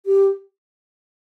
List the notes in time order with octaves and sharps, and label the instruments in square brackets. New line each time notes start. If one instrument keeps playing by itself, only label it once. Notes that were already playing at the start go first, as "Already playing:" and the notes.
[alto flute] G4